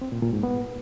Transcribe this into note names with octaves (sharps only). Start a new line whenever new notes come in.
C4
A#2
A#2
G#2
B3